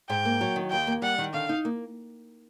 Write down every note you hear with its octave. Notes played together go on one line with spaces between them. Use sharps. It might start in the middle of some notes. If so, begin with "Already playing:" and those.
G#2 G5
A#3
F#3
D#3
D#2 G5
A#3
G3 F#5
D#3
D3 F5
D#4
A#3